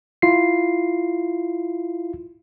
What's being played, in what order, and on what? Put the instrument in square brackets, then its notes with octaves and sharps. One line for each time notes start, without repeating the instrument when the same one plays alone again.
[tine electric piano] E4 F4 C7